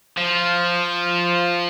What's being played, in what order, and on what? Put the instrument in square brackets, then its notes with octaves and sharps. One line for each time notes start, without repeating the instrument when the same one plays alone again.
[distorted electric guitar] F3